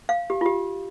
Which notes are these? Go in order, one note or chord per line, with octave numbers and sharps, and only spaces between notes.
F5
G4
F4
G4